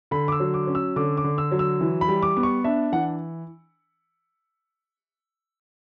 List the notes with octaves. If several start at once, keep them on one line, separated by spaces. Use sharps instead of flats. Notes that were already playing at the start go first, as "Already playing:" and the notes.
D3 B5
D6
E6
F#3
D6
C#4
E6
D3 D6
D6
D3
E6
F#3
E6
E3
B5
G3
D6
B3
C#6
D4 E5
E3 F#5